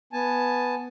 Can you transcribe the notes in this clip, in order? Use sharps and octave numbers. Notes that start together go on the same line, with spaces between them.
B3 G#5 A5